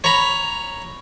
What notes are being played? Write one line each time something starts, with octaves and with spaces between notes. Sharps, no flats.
C#5 A#5 B5